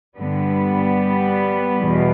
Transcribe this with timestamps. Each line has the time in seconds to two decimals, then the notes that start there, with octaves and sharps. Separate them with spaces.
0.18 G2 D3 G3 B3
1.79 E2 B2